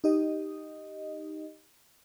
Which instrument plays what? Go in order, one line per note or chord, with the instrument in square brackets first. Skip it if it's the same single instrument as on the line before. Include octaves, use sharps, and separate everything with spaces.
[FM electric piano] D#4 G4 D#5